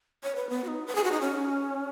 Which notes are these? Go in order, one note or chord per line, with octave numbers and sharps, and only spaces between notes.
C#5
B4
B3
F#4
D#4
B4
G#4
F#4
D#4
C#4